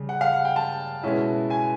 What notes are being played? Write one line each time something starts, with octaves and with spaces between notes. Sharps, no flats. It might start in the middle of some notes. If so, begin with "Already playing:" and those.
Already playing: C#3 G3
F#5
F5
F#5
G5
A5
B2 G#3 C#4 E4
G#5